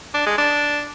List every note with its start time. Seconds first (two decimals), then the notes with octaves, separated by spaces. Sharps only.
0.14 D4
0.26 G#3
0.38 D4